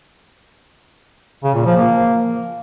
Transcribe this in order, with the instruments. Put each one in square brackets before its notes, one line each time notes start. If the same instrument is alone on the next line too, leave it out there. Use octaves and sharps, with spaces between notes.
[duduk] C#3
A#2
F3
A#3